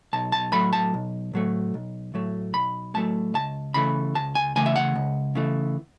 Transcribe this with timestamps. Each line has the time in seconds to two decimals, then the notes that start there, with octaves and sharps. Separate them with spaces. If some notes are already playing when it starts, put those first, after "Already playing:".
0.13 B1 A5
0.32 A5
0.52 A2 F#3 A3 B5
0.73 A5
0.94 B1
1.34 A2 F#3 A3
1.74 B1
2.14 A2 F#3 A3
2.54 B1 B5
2.94 A2 F#3 A3 A5
3.34 C#2 A5
3.74 C#3 E3 A3 B5
4.15 C#2 A5
4.35 G#5
4.56 C#3 E3 A3 G#5
4.66 E5
4.76 F#5
4.95 C#2
5.35 C#3 E3 A3